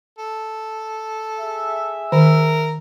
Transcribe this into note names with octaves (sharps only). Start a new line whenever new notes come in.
A4
G#4 E5
D#3 A#4